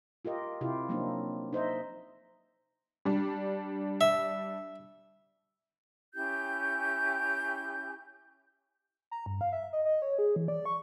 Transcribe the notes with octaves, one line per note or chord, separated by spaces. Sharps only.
F4 G4 A#4 D#5
C3 E4 F4 G4
F3 F#3 A#3 C4 D4 D#4
D#4 C5 D#5 E5
G3 D4
E5
C#4 E4 G4 G6
A#5
G2
F5
E5
D#5
D#5
C#5
G#4
E3
D5
C#6